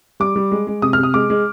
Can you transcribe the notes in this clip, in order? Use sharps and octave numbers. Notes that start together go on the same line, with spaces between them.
G3 D6
G3
G#3
G#3
C3 D#6
C3 F6
D#6
G#3 D6
G#3